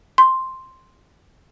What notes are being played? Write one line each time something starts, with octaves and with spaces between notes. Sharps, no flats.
C6